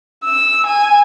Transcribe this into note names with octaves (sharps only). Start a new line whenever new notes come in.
E6
G#5